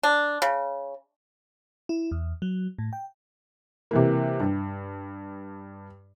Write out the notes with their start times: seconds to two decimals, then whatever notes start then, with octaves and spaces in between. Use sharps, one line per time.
0.03 D4
0.42 C#3
1.89 E4
2.12 E2
2.42 F#3
2.79 A2
2.93 G5
3.91 C3 E3 A#3
4.40 G2